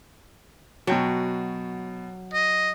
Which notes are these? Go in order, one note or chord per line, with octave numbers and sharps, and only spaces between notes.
B2 F#3 G5 A5
D#5